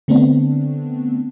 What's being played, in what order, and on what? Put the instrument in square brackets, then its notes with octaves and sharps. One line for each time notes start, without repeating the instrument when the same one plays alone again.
[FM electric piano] D3 A3 B3 C4 D4